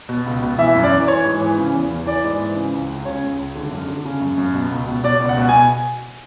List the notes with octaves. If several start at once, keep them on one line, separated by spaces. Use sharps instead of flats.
B2
C#2
B2
E3 E5
F#2
D5
E3
E3 C#5
G#2
E3
C#3
E2
E2
E3 D5
G#2
E3
C#3
C#2
C#2
C#3 C#5
C#2
C#2
D3
F#2
D3
C#3
F#2
F#2
B2
C#2
B2
B2 D5
C#2
F#5
B2
G#5